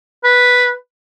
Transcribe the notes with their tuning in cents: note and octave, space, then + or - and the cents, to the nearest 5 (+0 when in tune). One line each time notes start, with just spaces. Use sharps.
B4 -5